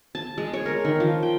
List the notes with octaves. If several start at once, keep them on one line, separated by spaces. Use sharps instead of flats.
A5
G#3
C#5
A#4
D#3
F3
G5